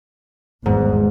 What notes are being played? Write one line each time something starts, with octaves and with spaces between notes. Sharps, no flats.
G#1 E2 G#2